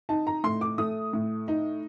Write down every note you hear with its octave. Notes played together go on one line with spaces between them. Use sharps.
D#4 A5
A#5
A2 C6
D6
A3 D#6
A2
D#4